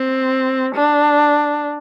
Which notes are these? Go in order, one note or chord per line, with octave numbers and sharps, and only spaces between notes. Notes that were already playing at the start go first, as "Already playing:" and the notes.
Already playing: C4
D4